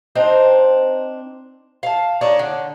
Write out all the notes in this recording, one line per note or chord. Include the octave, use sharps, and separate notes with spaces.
C4 D4 D#4 C5
F5 A5
D4 D#4 C#5
D3